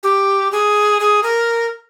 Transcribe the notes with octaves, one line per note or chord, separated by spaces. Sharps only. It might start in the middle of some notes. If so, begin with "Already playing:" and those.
G4
G#4
G#4
A#4